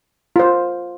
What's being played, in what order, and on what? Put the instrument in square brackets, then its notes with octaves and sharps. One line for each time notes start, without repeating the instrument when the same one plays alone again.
[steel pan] F4 C5